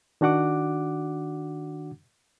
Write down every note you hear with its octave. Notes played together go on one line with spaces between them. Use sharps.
D#3 D4 F#4 F#5 D6